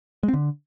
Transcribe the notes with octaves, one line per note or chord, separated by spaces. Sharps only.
G#3
C4
D3